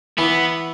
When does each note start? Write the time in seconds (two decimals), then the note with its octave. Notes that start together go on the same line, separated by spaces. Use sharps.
0.18 E3 B3